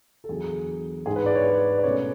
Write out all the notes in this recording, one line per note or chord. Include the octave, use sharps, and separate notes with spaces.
A4
E2 D3 F#3 G#4
G#2 G#3 D4 G#4
B4
D5
C#5
B4
D5
B2 A3 C#4 C#5